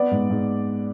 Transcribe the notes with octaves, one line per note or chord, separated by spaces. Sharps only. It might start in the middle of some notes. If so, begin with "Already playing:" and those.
Already playing: B3 D5
G#2
G#2